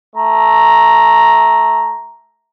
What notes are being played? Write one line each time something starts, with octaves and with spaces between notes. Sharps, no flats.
A3 A#5